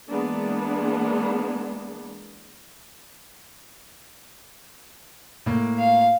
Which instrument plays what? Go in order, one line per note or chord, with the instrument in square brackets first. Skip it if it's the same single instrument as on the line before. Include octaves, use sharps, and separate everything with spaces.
[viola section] E3 G#3 A#3 B3 D4
[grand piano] A2 A#3
[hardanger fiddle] F5